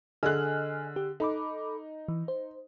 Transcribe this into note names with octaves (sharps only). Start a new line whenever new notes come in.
D3 G#4 D#5 G#5 F6 F#6
G4
D#4 A4 B5 D6
E3
C5